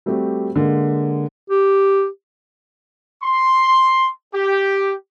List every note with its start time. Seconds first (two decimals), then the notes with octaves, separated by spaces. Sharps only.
0.06 G3 A3 C4 F#4 G4
0.56 D3 G#3 A#3
1.50 G4
3.23 C6
4.34 G4